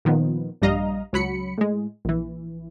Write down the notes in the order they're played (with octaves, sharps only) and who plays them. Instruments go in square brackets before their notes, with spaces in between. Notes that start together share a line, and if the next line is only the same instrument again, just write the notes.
[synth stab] A#2 D#3 F3 B3
A#1 G2 G3 D#5 F5 A#5
C#2 F#3 B5 C#7
A2 G#3
A#1 E3